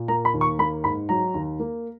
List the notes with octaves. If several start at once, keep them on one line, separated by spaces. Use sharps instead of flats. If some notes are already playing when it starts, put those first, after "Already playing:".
Already playing: A#2
A#3 A#5
B5
D#2
C#6
A#3 B5
G#2 B5
F#3 A#5
D#2
A#3